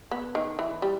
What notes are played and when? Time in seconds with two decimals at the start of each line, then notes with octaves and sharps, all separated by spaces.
0.11 B3
0.35 D#3
0.59 E3
0.82 G3